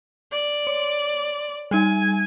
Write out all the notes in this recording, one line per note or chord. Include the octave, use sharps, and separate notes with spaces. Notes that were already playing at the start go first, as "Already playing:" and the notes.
D5
C#5 C6
G3 D#4 G#5